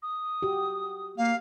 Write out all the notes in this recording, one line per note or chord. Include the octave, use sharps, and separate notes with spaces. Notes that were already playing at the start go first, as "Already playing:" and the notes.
D#6
F#4 G4
A#3 F5